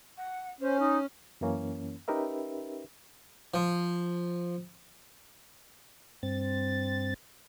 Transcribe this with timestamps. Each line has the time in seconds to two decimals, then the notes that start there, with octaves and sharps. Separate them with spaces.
0.18 F#5
0.61 C#4 C5
0.79 D#4
1.41 F#2 E3 A#3 C#4
2.08 C#4 D#4 G4 A#4 B4 E5
3.54 F3
6.23 G2 C4 A6